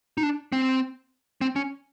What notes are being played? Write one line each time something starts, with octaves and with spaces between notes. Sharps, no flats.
D#4
D4
C4
C4
C#4